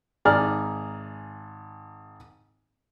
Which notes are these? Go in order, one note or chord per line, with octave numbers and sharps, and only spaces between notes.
G#1 G#4 D5 A#5 F6